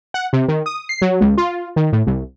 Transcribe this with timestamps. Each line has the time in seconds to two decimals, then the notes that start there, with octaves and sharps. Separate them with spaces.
0.14 F#5
0.33 C3
0.48 D#3
0.66 D#6
0.89 C7
1.02 F#3
1.21 C#2
1.38 F4
1.76 D#3
1.92 A2
2.07 C2